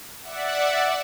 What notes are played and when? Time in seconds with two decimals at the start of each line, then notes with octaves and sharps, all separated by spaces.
0.21 D5 E5 F#5